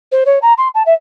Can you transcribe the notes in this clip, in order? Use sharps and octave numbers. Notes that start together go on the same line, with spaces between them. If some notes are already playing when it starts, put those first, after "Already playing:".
C5
C#5
A#5
C6
A5
E5